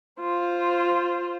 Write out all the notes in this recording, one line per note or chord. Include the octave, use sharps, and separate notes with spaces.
F4 C5